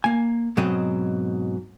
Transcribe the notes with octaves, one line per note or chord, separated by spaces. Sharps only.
A#3 G#5
G#2 B2 F#3 C4 D#5